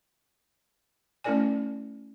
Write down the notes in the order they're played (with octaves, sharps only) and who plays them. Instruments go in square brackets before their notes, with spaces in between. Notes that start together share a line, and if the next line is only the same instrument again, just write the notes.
[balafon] A3 C#4 E4 A#4 D5 G#5